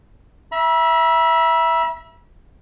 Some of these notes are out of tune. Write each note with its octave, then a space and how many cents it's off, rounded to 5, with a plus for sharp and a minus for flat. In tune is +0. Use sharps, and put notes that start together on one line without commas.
E5 +0 B5 -45